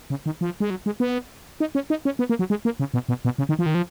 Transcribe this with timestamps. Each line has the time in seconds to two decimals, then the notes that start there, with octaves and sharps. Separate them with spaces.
0.10 C#3
0.26 D#3
0.41 F3
0.60 G#3
0.70 F#3
0.86 G#3
1.00 B3
1.60 D#4
1.75 C#4
1.90 D#4
2.05 C#4
2.19 B3
2.30 A#3
2.39 F#3
2.50 G#3
2.65 A#3
2.80 C#3
2.94 B2
3.09 B2
3.25 B2
3.38 C#3
3.49 D#3
3.59 F3
3.66 D#3
3.75 F3